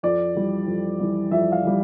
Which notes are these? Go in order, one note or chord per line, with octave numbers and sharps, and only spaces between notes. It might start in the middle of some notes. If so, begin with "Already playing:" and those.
F2 D5
E3 G3
F2
E3 G3
F2 E5
F5
E3 G3